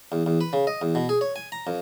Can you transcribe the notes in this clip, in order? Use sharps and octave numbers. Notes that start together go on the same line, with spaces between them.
E2
E2
B4
C#3
D#5
E2
B2
G#4
C#5
G#5
A#5
F2